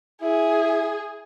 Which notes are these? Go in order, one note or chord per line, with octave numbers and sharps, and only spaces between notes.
E4 G#4